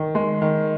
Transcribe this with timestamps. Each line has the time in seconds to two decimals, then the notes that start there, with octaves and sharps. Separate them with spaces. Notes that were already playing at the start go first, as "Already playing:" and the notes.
Already playing: D#3
0.15 G#3
0.42 D#3